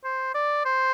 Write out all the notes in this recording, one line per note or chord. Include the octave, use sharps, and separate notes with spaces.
C5
D5
C5